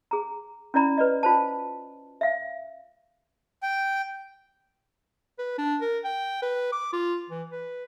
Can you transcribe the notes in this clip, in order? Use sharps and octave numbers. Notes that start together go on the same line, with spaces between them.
G#4 A#5
C#4 E4 D5 A#5 B5
B4 D5 D#5
F4 C5 A5
E5 F5
G5
B4
D4
A#4
G5
B4
D6
F4
E3
B4